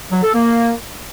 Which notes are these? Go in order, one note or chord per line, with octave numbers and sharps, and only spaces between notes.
F#3
A4
A#3